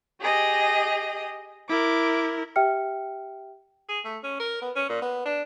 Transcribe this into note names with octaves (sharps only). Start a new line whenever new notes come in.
G4 G#4 D#5
E4 A#4 D6
G4 E5 G5 F6 C#7
G#4
A3
C#4
A#4
B3
C#4
A#2
B3
D4